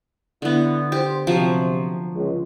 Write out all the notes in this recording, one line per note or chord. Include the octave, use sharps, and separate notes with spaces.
D3 B3 D4 E4
G4 C5
C3 F3 F#3
C#2